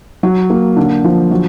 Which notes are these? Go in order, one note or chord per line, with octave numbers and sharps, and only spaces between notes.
F#3
A#3
D3
F3
F#3